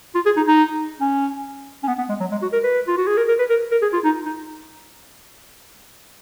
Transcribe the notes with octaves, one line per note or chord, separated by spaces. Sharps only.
F4
G#4
D#4
D#4
C#4
C#4
B3
B3
G#3
F#3
G#3
F#4
A#4
B4
F4
F#4
G#4
A#4
A#4
B4
A#4
A#4
G#4
F4
D#4
D#4